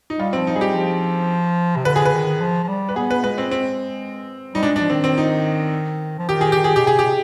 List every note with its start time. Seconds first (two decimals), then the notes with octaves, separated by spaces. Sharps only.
0.10 D#4
0.19 G3 F4
0.33 C4
0.37 F3
0.47 D#4
0.56 G3 G#4
0.61 G4
0.74 F3
1.76 C3
1.85 D3 B4
1.96 G#4
2.05 B4
2.13 D#3
2.41 F3
2.64 F3
2.68 G3
2.89 B4
2.96 B3 G#4
3.11 B4
3.24 G#3 B4
3.38 C4
3.51 C4
4.54 G3 D#4
4.63 G#3 D4
4.76 D4
4.81 F3
4.90 D#3 C4
5.04 C4
5.18 D#4
6.18 F3
6.29 D#3 G4
6.41 G#4
6.52 D#3 G4
6.64 G#4
6.76 B2 G4
6.84 C3 G#4
6.99 G4
7.04 C3